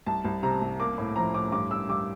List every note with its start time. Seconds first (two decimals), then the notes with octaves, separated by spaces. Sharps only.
0.06 C2 A5
0.25 C2
0.43 C3 A#5
0.62 C2
0.80 A#3 D6
0.98 A2
1.16 F3 A#5
1.34 A2 D6
1.52 G2 D6
1.71 G2 E6
1.89 G2 D6